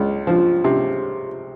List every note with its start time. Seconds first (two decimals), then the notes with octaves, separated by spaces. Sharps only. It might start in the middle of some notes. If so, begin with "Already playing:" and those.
Already playing: C#2
0.27 F3
0.64 C3